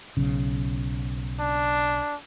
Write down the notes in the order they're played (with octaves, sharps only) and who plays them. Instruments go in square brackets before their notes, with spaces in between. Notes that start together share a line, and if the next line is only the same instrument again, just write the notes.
[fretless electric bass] B1 C#3
[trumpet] D4